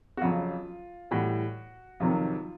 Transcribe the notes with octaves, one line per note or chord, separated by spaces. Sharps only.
F#4
F2 C#3 F#3 F4
A2 E3 G3 F#4
F2 C3 D#3 F#3 F4